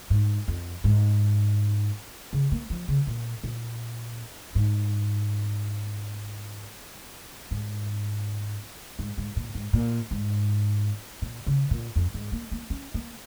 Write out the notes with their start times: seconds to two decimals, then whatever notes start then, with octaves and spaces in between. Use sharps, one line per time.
0.10 G#2
0.48 F2
0.84 G#2
2.33 C#3
2.52 A#3
2.70 F3
2.88 C#3
3.07 A#2
3.44 A#2
4.55 G#2
7.51 G#2
8.99 G#2
9.18 G#2
9.36 A#2
9.55 G#2
9.73 A#2
10.11 G#2
11.22 A#2
11.46 C#3
11.71 A#2
11.96 F2
12.14 G#2
12.32 A#3
12.52 A#3
12.70 C#4
12.94 A#3